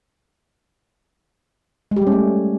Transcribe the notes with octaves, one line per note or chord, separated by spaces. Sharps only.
G#3
G4
G3
C#4
A3